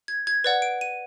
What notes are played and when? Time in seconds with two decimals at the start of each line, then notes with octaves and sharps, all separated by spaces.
0.08 G#6
0.27 G#6
0.44 B4 D5 F#5
0.62 D7
0.81 D#7